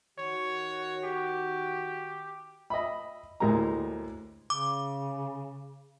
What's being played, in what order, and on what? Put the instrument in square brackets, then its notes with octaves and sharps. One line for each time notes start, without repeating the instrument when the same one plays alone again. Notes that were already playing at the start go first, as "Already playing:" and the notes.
[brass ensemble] D#3 F#4 [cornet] C#5
[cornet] G4
[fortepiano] D#5 E5 B5
D2 A2 G#3 A#3 G4 A#5
[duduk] C#3 [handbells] D6